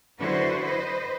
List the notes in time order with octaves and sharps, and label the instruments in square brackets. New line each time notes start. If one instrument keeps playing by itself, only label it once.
[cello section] D3 F#3 E4 F#4 B4 C5
B4 C5 D#5